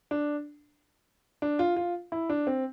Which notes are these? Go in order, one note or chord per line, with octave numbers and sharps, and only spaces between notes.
D4
D4
F4
F4
E4
D4
C4